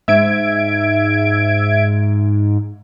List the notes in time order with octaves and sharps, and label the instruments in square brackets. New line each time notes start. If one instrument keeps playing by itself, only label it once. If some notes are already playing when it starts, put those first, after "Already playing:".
[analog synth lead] G#2 [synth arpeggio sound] E5 G#6 D7